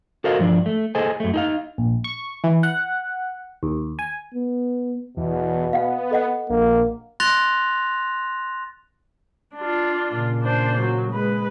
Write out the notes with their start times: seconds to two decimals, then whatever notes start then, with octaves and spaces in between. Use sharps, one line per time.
0.24 F#4 A4 A#4 C5 D#5 F5
0.39 G2 F3 D4
0.66 A3
0.95 G#4 A4 C5 D#5 G#5
1.20 F#2 A3
1.34 D#4 A4 F5
1.78 A#1
2.04 C#6
2.44 E3
2.63 F#5
3.63 D#2
3.99 G#5
4.34 B3
5.17 E2 B2
5.73 B3 F5 F#5
6.11 A4 D#5 F#5
6.50 A#1 A#3
7.20 C6 F#6 A6 A#6 F7
9.56 D4 F4
10.10 A#2 C#3
10.42 D4 C5
10.81 F#3
11.12 G#3 B4